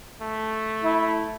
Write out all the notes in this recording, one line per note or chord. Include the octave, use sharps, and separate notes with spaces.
A3
E4